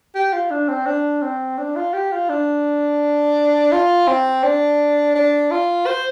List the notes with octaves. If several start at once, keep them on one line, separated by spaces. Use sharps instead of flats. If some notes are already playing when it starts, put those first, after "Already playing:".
G4
F4
D4
C4
D4
C4
D4
F4
G4
F4
D4
F4
C4
D4
D4
F4
C5